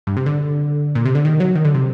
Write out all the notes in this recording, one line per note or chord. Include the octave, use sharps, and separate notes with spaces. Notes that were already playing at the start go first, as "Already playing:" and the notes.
G2
C3
D3
A#2
C3
D3
D#3
F#3
D#3
D3
C3